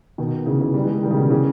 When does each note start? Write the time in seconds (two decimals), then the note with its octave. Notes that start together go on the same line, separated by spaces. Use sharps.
0.18 B2 D#3
0.46 C#3 E3
0.60 C#3 E3
0.74 D#3 G3
0.84 E3 G#3
1.03 D#3 G3
1.11 C#3
1.17 B2 D#3
1.30 C#3 E3